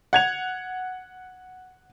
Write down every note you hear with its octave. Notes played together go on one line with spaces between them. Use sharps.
F#5 G#6 F7